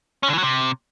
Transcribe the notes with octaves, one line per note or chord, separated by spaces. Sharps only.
C#4
D3
E3
F#3
C3